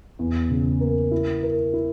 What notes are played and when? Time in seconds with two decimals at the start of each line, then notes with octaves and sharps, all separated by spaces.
0.19 E2
0.50 C#3
0.81 A#3
1.11 E4
1.43 A#4
1.73 E4